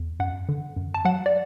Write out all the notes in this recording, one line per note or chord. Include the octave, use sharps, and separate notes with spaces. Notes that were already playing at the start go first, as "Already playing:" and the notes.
Already playing: E2
F#2 F#5
D3
F#2
A5
F#3 F#5
D5